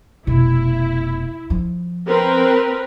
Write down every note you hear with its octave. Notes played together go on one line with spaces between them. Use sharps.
F1 B2 E4
F3
C4 A#4 B4